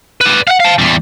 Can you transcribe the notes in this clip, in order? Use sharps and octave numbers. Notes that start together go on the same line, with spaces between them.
B4 D5
F5 F#5
F5 A5
E2 G3